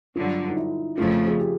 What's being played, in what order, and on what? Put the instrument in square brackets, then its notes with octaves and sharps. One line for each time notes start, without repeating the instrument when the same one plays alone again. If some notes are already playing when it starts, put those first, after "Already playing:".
[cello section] G2 D3 F#3 [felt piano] F4
[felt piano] D#4
E4
[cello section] F2 C#3 F3 A3 [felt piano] F4
[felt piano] G#4
G4